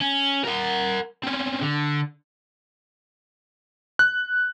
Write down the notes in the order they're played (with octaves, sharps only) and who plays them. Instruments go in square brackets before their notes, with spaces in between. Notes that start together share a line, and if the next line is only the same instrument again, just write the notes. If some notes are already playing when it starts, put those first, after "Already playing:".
[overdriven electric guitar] C#4
A#4 F#5
C4 C#4
D3
[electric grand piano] F#6